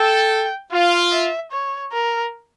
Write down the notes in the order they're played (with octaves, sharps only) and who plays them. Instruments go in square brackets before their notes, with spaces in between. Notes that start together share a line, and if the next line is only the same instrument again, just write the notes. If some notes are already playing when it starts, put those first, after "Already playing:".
Already playing: [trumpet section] A4 [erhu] G5
[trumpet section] F4 [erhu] F5
[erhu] E5
C#5
A#4